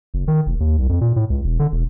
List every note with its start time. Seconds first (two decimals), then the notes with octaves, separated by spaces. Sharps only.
0.14 F#1
0.28 D#3
0.46 F1
0.60 D#2
0.78 C2
0.89 F2
1.01 A#2
1.16 A2
1.30 C#2
1.44 E1
1.59 D3
1.72 E1